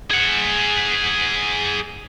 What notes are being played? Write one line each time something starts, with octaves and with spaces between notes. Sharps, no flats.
G#4 F#5